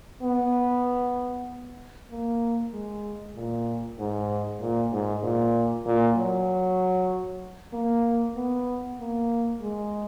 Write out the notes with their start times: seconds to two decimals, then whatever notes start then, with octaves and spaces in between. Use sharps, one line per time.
0.22 B3
2.11 A#3
2.73 G#3
3.35 A#2
3.99 G#2
4.61 A#2
4.92 G#2
5.23 A#2
5.86 A#2
6.16 F#3
7.73 A#3
8.35 B3
8.99 A#3
9.61 G#3